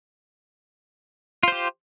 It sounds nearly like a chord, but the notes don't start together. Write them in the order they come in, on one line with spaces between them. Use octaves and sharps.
F4 C5 G4